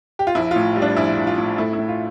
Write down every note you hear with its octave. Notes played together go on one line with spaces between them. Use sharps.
G4
F4
A#1 E4
A2 F4
G3
D4
A#1 E4
A#1
F4
A2
A3 E4
E4
A2
F4